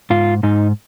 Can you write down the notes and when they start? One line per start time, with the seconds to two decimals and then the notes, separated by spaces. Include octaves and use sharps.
0.10 G#2 F4
0.43 G#2 D#4